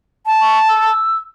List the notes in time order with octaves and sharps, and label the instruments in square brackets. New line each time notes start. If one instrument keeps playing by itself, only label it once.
[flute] A5
[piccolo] C#6
E6